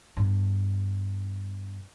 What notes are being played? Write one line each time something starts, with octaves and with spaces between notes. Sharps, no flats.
G2 B2